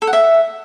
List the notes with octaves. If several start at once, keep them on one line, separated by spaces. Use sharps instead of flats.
A4
F#5
E5